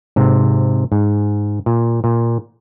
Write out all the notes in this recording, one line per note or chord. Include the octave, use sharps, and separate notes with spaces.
G#2 C3
G#2
A#2
A#2